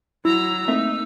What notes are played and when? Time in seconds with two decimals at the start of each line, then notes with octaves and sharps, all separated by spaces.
0.25 F#3 E4 A#5 E6
0.68 A3 A#3 C4 D#4 E5